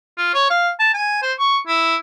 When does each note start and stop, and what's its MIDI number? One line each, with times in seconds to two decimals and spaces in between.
0.18 0.30 65
0.34 0.45 73
0.50 0.70 77
0.79 0.90 81
0.94 1.19 80
1.22 1.33 72
1.39 1.57 85
1.67 1.96 64